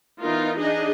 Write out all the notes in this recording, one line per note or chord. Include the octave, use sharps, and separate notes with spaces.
E3 B3 D#4 F4 A#4
D4 D#4 G#4 D#5